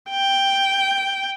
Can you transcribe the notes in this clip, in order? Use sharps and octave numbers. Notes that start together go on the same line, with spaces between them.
G5